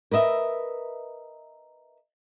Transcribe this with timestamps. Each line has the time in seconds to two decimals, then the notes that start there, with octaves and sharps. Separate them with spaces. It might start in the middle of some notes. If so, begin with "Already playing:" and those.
0.11 A#4 B4 D#5 E5